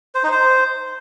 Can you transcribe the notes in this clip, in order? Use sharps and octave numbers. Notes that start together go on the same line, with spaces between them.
C5
D#4
C5